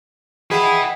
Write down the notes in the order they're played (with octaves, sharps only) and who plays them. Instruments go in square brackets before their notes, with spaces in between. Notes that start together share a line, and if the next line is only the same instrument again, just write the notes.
[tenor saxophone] G#4 [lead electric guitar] B4 E5 [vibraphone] D#5 F#5 G5